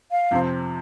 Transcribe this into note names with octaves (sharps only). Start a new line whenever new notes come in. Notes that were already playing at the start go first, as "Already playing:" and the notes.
F5
F2 C3 F3 C4